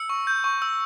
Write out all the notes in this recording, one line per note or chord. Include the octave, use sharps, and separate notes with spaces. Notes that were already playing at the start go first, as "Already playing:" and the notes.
Already playing: E6 C#7
C#6
G6
C#6
E6